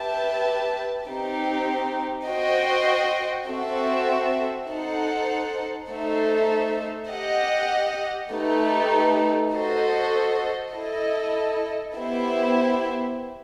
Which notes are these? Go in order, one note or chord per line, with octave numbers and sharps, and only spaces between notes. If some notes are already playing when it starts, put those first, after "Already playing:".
Already playing: G4 B4 E5 A5
C4 D#4 G4
F#4 C5 D#5 G5
C4 F#4 A4 E5
D#4 A4 C5 F#5
A3 D#4 A4 C5 E5
G4 D#5 F#5
A3 D#4 G4 B4
F#4 A4 C5 D#5
E4 A4 D#5
B3 E4 G4 C5 E5